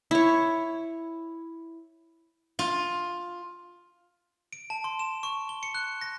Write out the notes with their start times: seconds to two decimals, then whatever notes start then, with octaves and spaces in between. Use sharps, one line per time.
0.11 E4 C#5
2.59 F4
4.53 D7
4.70 A5
4.84 C6
4.99 E7
5.23 C#6
5.49 G7
5.63 C#7
5.75 F#6
6.01 A#6